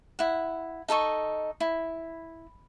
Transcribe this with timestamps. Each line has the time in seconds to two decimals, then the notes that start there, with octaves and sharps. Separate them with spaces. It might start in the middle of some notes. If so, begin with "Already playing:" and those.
0.19 E4 F#5
0.88 D#4 A4 D#5 C#6
1.60 E4